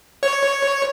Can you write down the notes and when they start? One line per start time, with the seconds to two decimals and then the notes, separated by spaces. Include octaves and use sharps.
0.23 C#5